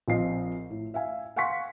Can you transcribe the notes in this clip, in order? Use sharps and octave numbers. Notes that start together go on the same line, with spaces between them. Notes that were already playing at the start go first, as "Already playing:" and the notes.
A#1 F3 C4 F4 D#5 C7
A2
E5 F5 G#5
F5 F#5 G#5 C6 C#6 B6